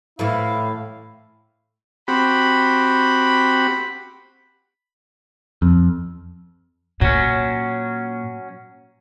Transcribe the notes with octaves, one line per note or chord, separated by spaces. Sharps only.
A2 E3 A3 E4 F5
C4 F#4 G4 B5
F2
A#2 F#3 C#4